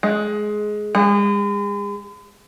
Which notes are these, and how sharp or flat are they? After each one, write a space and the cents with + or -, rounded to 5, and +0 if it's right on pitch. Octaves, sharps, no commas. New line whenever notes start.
G#3 +15
G#3 -40